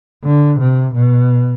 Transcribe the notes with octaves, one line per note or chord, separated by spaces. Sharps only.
D3
C3
B2